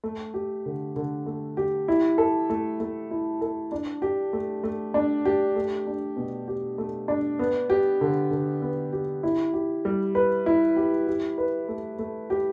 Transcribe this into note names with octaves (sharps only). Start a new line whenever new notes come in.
A3
G4
D3
D3
A3
G4
E4
A4
A3
A3
E4
A4
D4
G4
A3
A3
D4
G4
A3
D4
B2
G4
A3
D4
B3
G4
D3
D3
B3
G4
E4
G4
G3
B4
E4
G4
G4
B4
A3
A3
G4